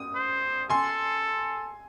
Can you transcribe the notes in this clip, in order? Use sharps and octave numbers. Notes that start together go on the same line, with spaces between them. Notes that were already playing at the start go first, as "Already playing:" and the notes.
Already playing: D#6
C5
A4 G#5 C6